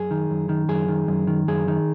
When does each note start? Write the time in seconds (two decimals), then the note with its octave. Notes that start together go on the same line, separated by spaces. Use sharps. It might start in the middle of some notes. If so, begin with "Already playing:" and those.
Already playing: F#2 G#4
0.11 D#3
0.30 F#2
0.49 D#3
0.68 F#2 G#4
0.88 D#3
1.08 F#2
1.27 D#3
1.48 F#2 G#4
1.68 D#3